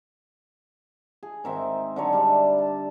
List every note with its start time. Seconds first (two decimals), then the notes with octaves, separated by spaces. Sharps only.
1.23 G#4
1.44 G#2 D#3 C4 E5
1.96 D3 F#3 G#3 C#5
2.13 G3 D4 E5
2.59 A5